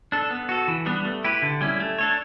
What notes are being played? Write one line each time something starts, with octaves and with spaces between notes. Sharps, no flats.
D4 A4
B3
F#4 A4
E3
G3 B3 D4
A3
E4 G4 B4
D3
G3 C#4 E4
A3
D4 A4 C#5